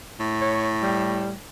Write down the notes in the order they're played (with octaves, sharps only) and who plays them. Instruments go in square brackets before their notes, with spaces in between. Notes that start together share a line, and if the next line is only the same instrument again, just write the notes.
[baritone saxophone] A2
[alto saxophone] C#5
G3